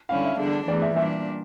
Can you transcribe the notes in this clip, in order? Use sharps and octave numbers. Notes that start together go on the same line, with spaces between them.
D3 G3 C#4 E4 F5
E5
E2 D3 G3 D4
E2 E3 A3 D5
E5
A#2 G3 D4 E5